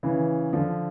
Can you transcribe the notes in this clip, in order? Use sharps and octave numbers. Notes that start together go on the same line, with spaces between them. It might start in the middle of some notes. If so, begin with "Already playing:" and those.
C#3 E3
D3 F3